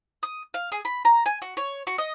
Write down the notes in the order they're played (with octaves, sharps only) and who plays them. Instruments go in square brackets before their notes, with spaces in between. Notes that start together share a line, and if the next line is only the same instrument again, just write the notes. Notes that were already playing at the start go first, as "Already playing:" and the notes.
[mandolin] D#6
F5
G#4
B5
A#5
G#5
F#4
C#5
F#4
D#5